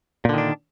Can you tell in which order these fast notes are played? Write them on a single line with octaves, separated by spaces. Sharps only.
A#2 D3 D#3 D4